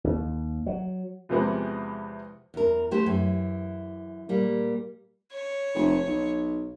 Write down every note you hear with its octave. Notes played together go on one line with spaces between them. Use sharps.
D#2
F#3
E2 C3 F3 G#3 B3 C4
E2 A#4
E3 A3 G4 C5
F#2 E3
A#2 G3 A#3
C#5
F1
B1